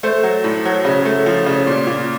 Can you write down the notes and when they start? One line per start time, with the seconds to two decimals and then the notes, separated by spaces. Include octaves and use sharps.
0.03 A3 C5
0.23 F#3
0.44 A2
0.65 F#3
0.85 C#3
1.05 A3
1.26 F3
1.46 C#3
1.67 A#2
1.87 A#2